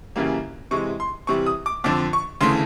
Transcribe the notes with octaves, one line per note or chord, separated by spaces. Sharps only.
F#2 C#3 E3 G3 A#3
C3 E3 G#3 C#6
C6
C3 E3 G3 C#6
D#6
D6
F2 D3 F3 D6
C#6
D2 C#3 E3 A3 C6